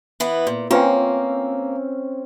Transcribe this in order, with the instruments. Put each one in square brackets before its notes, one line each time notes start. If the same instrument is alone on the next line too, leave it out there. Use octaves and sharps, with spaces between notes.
[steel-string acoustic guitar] E3 B3
A#2
[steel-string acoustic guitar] A#3 [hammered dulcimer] C4 C#4 [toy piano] F4 B4 G5